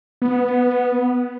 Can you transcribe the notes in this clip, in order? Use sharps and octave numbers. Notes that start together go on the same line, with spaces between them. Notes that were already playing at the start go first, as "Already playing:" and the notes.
B3